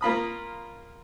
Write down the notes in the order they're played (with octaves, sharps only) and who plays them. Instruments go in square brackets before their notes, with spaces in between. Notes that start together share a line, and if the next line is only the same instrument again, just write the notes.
[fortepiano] A#3 F4 B5 D#6